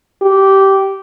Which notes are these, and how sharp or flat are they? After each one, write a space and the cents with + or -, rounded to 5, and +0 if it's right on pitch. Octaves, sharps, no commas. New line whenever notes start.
G4 -15